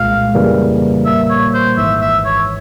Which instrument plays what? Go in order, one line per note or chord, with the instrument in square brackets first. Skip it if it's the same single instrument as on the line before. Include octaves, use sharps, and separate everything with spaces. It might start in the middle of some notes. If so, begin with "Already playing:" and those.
Already playing: [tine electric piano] C2 A#2 G#3 [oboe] F5
[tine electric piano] F2 C#3 E3 G3 A#3
[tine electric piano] A#1 A#2 G3 A#3 [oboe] E5
[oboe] C#5
C5
[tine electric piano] G#1 G#2 E3 [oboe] E5
[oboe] E5
C#5